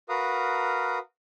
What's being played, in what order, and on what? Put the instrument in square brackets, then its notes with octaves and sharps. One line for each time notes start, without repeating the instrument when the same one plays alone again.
[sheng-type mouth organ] F#4 A#4 B4 F5 A#5 D#6